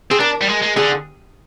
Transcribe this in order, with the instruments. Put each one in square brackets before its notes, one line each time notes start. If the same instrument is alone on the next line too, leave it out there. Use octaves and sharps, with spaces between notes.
[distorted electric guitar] C4 [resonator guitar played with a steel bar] G#4
[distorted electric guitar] D4 [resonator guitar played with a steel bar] A#4
[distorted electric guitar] G3
G#3
G#3
[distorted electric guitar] D3 [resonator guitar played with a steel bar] G#4